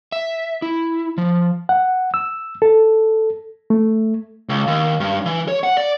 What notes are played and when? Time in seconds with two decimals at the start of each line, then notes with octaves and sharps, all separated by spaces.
0.12 E5
0.62 E4
1.18 F3
1.69 F#5
2.14 E6
2.62 A4
3.70 A3
4.49 C#2
4.67 D#2
5.00 G2
5.25 E3
5.48 C#5
5.64 F#5
5.77 D5